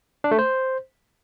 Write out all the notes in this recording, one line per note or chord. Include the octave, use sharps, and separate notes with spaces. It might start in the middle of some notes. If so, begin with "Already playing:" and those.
D4
A3
C5